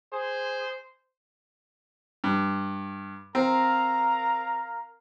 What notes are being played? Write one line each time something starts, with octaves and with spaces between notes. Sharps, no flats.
G#4 C5
G2
C4 A#4 F5 A#5